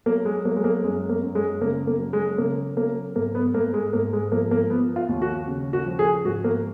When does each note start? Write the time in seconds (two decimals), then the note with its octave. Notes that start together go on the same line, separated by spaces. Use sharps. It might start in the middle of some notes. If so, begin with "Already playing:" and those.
0.06 F#3 A#3
0.25 G#3
0.45 F#3 A#3
0.56 G#3
0.64 A#3
0.84 F#2 G#3
1.09 A#3
1.22 F#2
1.35 G#3
1.61 C#3 A#3
1.87 A#3
1.99 F#3
2.13 G#3
2.38 C#3 A#3
2.77 F#3 A#3
3.16 G#2 A#3
3.35 B3
3.54 G#2 A#3
3.74 G#3
3.93 G#2 A#3
4.13 G#3
4.32 F3 A#3
4.51 A#3
4.70 F3 B3
4.96 F4
5.09 D#2
5.22 F#4
5.47 C#3
5.73 F#4
5.86 F3
5.99 G#4
6.24 G#2 F#4
6.44 A#3